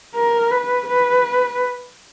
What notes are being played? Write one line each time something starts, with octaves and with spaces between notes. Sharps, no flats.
A#4
B4
B4